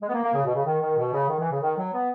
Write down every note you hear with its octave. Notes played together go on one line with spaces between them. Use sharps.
G#3
B3
A#3
A#3
C#3
B2
C#3
D#3
D#3
B2
C#3
D#3
E3
C#3
D#3
F#3
B3